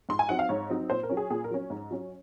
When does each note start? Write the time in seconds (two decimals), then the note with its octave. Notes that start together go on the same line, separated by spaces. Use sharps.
0.09 G#2 C6
0.19 G#5
0.29 F#3 C4 D#4 F#5
0.39 F5
0.49 G#2 C#5
0.70 F#3 C4 D#4
0.90 A#2 C5
1.03 A#4
1.09 F#3 C#4
1.17 G#4
1.30 A#2 G#4
1.44 A#4
1.51 F#3 C#4
1.70 G#2
1.91 F#3 C#4